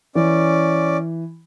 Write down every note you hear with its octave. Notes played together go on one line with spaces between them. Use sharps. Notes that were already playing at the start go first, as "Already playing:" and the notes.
E3 C#4 D5